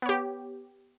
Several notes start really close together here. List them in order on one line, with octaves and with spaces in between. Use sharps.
B3 C#5 G4